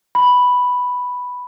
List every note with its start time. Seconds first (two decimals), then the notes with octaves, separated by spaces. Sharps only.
0.15 B5